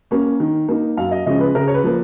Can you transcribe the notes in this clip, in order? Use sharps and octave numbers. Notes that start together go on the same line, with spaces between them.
A#3 C#4
D#3
A#3 D#4
F#2 F5
D#5
C#3 F3 G#3 C#4 D#5
B4
C#3 A#4
C#5
B4
F3 A#3